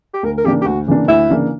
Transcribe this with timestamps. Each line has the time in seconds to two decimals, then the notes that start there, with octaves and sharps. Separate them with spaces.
0.14 G4
0.23 D2 A#4
0.38 A#4
0.44 C#3 E3 A#3 D4 G4
0.61 G4
0.65 D2 F#4
0.87 C#3 E3 A#3 D4
1.08 D2 E4
1.29 C#3 E3 A#3 D4